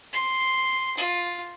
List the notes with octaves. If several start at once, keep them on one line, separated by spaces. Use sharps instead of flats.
C6
F4